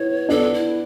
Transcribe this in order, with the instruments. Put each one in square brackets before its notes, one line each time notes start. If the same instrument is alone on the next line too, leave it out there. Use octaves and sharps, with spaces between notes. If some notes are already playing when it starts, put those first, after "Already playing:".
Already playing: [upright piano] B3 E4 [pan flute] C#5
[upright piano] B3 D4 [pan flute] A4
[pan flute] E4